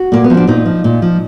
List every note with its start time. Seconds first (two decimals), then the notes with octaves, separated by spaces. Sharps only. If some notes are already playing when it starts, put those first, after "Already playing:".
Already playing: F#4
0.12 A#2 A#3
0.24 B3
0.30 F3
0.37 D4
0.47 A#2 D#4
0.66 F3
0.84 A#2
1.02 F3